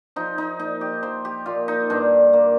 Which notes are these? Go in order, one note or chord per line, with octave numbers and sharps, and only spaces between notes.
F3 D#4
D#4
A#2 D#4
G4
F3 C5
G4
A#2 F4
D#4
G2 D4
A#3